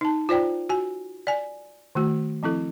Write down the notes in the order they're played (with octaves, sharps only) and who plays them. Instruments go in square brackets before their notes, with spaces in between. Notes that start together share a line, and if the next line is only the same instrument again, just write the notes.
[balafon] D#4 A5
F4 C5 D5 G5 A#5
F#4 G#5
D5 G#5
D#3 A3 F#4
F3 C4 E4 A4